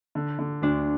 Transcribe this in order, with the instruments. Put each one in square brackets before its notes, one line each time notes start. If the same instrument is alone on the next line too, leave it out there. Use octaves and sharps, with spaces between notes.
[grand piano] D3
D3
[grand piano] D2 [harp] D4